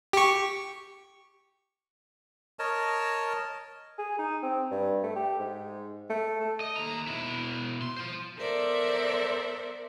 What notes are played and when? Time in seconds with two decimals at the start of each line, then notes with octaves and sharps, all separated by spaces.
0.13 G4 C#6
2.59 A#4 C#5 D#5 A5
3.98 G#4
4.19 D#4
4.42 C4
4.71 G2
5.03 A3
5.16 G4
5.40 G#2
6.10 A3
6.40 A4
6.61 D#5
6.76 D#2 A#5
7.07 B2 E4
7.82 C6
7.96 F4 C5
8.39 B3 A4 A#4 C5 D5 E5